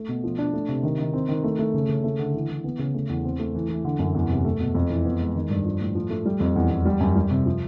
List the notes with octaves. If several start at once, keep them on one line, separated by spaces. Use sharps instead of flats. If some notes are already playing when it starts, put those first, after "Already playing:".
Already playing: A3
B2
F3
D4
A3
C3
D#3
D#3
C4
D#3
A3
A3
C#3
C#3
A3
D3
E3
E3
B3
C#3
A3
E2
C4
A3
E3
E3
D3
F#2
E2
C3
A3
B2
F2
E3
B3
G#3
D#3
G2
F3
A2
F3
A3
G3
F2
E2
E2
G3
F#2
G3
C3
F3